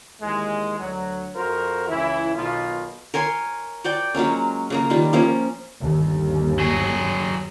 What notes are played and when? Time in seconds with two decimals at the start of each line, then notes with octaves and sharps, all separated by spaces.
0.21 D#2 E3 G#3
0.79 D2 F#3
1.34 F2 F#4 A#4 C5
1.88 C#2 E3 E4
2.34 B1 B2 D#3 D#4 F4
3.14 A#4 C#5 G#5 C6
3.84 F#4 D5 G5
4.14 F#3 G#3 A#3 C#4
4.70 C#3 A#3 A#5
4.90 D#3 G3 F4
5.13 F3 A#3 C#4
5.81 G1 D#2
6.59 F#3 G#4